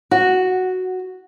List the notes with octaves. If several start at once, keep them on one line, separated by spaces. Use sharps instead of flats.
F#4